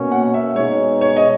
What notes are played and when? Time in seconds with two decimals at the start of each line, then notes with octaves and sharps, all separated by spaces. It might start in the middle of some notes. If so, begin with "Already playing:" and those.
Already playing: B2 A#3 C#4 F#4
0.12 F#5
0.34 E5
0.56 B2 G#3 D#4 C#5
1.01 C#5
1.16 D#5